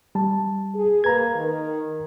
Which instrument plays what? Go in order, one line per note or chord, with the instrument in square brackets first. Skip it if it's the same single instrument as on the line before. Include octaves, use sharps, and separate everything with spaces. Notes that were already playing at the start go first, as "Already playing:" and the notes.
[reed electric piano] G3 A5
[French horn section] G#4
[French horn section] A#3 B4 [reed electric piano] A#5 G#6
[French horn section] D#3 A#4